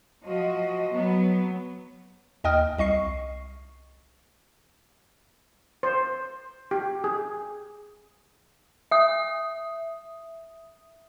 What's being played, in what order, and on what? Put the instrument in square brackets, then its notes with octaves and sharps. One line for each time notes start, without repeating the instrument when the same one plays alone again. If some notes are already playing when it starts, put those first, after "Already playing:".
[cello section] F3 F#4 D#5
F#3 B3
[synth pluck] D#2 D#5 G5 D#6 F6
C2 D#5 C#6 C7
[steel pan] C5
G4
G#4
[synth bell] E5 D#6